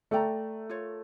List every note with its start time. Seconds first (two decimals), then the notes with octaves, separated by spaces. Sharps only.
0.11 A3 A4 D5 G5 A#5
0.70 F4 A#4 C#5